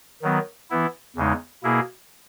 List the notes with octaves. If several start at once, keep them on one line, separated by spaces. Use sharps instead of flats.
D#3 F#3 B3
E3 B3 E4
E2 C#3 G#3 D#4
B2 A#3 E4 G#4